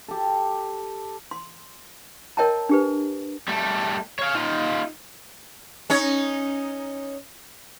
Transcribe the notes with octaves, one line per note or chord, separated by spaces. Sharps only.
G4 A4
C6
A#4 C#5 D#5 G5 A5 A#5
D4 G4 B4
G3 A3
C#5 F5
D#4 F4
C#4 D#4 C#5